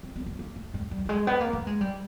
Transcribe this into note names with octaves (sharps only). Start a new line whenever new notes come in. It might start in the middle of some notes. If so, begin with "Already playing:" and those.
C4
B3
A#3
A#3
A3
G#3
G3
G3
G#3
B3
A#3
A3
G#3
G3